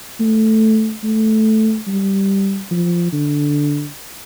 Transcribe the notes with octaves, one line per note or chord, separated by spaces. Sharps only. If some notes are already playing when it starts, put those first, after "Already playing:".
A3
A3
G3
F3
D3